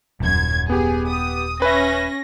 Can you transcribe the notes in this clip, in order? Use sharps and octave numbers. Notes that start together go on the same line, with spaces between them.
D#1 F#2 G#6
B3 G4 G#4
D#6
C#4 B4 E5 A#6